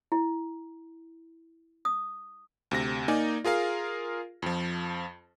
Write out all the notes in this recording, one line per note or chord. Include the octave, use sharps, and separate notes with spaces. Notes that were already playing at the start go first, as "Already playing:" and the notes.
E4
D#6
D2 C3 A#6
A#3 D#4 D5 G#5
F4 G#4 A#4 F5
F2 F3